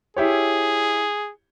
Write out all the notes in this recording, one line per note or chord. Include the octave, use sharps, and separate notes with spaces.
E4 G4 G#4 C#5